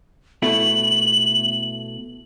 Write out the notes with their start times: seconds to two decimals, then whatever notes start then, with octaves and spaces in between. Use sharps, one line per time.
0.42 B2 A3 E4 F#7